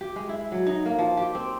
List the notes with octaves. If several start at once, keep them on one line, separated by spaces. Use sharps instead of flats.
G4
G#3
E4
F#3
D#4
A#3
F3
G4
C4